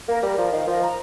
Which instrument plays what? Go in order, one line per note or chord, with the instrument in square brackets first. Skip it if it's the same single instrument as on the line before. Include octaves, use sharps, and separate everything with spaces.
[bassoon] A#3 [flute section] A#4
[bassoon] G3 [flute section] A#4
[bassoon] F3 [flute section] A#4
[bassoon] D#3 [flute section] F5
[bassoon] F3 [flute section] A#4
[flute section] A#5